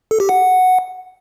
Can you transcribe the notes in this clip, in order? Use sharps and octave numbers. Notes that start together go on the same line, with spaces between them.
A4
G4
F#5